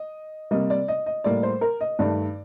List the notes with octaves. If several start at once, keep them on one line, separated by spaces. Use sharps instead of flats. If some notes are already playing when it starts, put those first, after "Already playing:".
Already playing: D#5
C3 G3 A#3 D#5
D5
D#5
D#5
A2 G3 A#3 D5
C5
A#4
D#5
G2 D#3 A3 D5